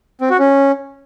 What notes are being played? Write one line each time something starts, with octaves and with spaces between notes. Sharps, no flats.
C4
F#4
C#4